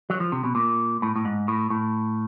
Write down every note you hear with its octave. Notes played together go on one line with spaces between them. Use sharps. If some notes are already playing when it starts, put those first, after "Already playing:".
F#3
F3
C3
B2
A#2
A2
A2
G#2
A2
A2